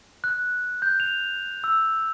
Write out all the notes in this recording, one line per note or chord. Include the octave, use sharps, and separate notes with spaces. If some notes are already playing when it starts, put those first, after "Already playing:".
F#6
G6
F7
E6